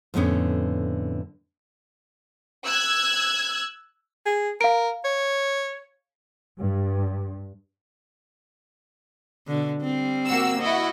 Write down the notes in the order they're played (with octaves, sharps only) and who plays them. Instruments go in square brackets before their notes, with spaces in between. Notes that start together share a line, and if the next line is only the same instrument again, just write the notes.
[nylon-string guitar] F2 A2 D3 B3 C#4
[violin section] E6 F#6 G#6
[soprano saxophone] G#4
[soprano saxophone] A#4 [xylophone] F5 D7
[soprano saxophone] C#5
[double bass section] G2
[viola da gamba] B2 D3
G3 C4
[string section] A#3 F#4 E6
[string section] E4 F#4 [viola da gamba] D#5